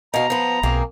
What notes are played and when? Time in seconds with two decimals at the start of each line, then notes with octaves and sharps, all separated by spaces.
0.14 B2 F5 A#5
0.30 F3 B3
0.63 B1 A#3 C4 G#4